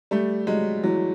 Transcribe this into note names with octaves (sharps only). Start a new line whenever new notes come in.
G3 A3
F#3 G#3
E3 F#3